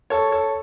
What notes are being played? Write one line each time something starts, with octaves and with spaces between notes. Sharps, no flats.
A4 C#5
A4 C#5